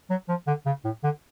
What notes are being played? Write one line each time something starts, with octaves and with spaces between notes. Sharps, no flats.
F#3
F3
D3
C#3
A2
D3